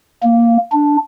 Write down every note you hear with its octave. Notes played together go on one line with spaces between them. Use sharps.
A#3
D4